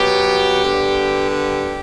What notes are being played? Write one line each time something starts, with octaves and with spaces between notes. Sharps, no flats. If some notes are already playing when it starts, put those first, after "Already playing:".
Already playing: B2 F#3 B3 G4
D3 G3 B3
G4